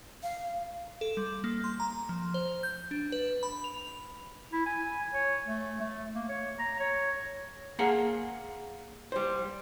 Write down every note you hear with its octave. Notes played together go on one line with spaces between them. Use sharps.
F5
A4
G3
A#3
C6
A#5
F3
C5
G6
D4
B4
B5
F7
E4
G#5
C#5
A3
A3
A#3
C#5
A#5
C#5
A#3 G#4 F#5
G3 C5